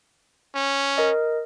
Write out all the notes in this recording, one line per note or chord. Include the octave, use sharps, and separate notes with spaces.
C#4
A#4 D#5